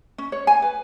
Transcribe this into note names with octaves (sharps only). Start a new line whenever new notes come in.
C#4
C#5
G#5
B4